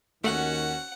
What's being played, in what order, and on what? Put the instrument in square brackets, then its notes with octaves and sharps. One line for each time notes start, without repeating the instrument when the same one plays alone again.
[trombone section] D#2 D#3 [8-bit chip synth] A3 [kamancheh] C#4 F#4 [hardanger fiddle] F#5